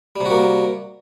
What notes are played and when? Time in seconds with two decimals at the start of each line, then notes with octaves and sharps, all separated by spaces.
0.16 G3
0.21 C3
0.25 F#4
0.30 A#3